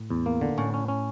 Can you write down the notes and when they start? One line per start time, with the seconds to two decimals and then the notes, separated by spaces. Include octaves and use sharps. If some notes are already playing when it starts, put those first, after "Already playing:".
Already playing: A2
0.10 E2
0.26 A#3
0.41 D3
0.58 A2 C#4
0.74 C#4
0.88 C#4